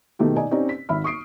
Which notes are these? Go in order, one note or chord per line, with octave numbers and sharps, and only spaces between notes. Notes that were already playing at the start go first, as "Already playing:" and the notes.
B2 D#3 A3 D#4 G4
D#4 D5 D#5 G#5
C4 C#4 D#4 G4 D5
B6
G#1 E5 B5 F6
C#6 D#6 C7 D7